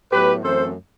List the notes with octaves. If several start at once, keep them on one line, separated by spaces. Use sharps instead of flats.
A2 F#3 B3 G4 B4
F#2 E3 A3 C4 A4 C5